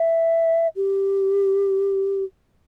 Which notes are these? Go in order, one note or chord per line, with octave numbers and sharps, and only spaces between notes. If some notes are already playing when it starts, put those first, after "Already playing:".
Already playing: E5
G4